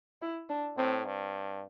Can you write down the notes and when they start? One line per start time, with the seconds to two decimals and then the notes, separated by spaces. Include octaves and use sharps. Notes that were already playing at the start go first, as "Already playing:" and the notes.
0.22 E4
0.49 D4
0.77 A2 C4
1.05 G2